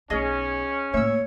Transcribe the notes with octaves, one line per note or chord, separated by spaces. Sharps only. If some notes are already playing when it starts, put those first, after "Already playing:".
B1 C#4 D#4 G#4 D#5
A2 A#3 C#5 E5 E6